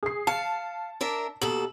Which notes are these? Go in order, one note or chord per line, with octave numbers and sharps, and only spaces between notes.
G#4 C7
F5 A5 C#7
D4 A#4 E5
D#2 B2 A4 F#7